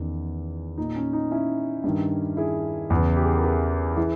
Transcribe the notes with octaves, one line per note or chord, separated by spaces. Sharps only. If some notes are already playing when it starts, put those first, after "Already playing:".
Already playing: E2 D#3 C#4
A#2 D#4
C#4
D#4
C#4 E4
G2 D#3
E4 G#4
E2 C#3 E3
G4
G#4
A#4
G#4 B4
E3 E4 G#4